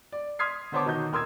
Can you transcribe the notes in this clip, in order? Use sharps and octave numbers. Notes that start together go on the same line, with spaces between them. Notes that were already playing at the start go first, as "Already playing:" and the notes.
D5
C6 D#6 F6 G#6 B6 C7
D3 B3 C5 C#5 A5 D6
B2 D#3 D#4 F#4 G6
D#1 A#4 C6 D#6 E6 G#6